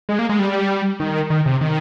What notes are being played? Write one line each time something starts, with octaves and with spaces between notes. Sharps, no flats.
G#3
A#3
G#3
G3
D#3
D#3
C3
D#3